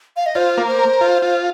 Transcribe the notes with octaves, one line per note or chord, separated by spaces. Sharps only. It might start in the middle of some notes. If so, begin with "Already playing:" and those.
F5
D#5
F4 C5
A#3
C5
A#4
F4
F4